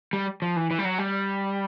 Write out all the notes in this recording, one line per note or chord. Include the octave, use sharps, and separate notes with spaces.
G3
F3
E3
E3
G3
F#3
G3